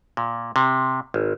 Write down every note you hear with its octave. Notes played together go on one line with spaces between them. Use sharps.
A#2
C3
G#1